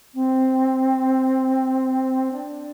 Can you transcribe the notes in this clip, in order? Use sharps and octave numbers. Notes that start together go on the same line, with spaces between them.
C4
D4